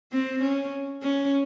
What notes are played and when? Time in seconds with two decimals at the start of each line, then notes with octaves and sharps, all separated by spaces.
0.12 C4
0.42 C#4
1.02 C#4